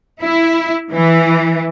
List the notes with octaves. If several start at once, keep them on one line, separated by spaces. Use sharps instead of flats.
E4
E3